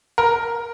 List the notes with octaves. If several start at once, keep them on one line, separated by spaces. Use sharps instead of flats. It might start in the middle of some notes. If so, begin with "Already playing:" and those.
A#4